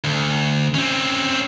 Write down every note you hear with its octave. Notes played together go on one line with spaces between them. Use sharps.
D2
C4 C#4